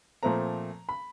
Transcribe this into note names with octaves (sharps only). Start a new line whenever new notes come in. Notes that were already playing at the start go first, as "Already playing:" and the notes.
A#2 F3 A3 C4 A#5
B5